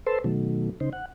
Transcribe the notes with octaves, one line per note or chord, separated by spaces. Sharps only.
A4 B4 C5 A5 C6 E6
B2 D#3 F#3 A3
C#3 D#4 C5
F#5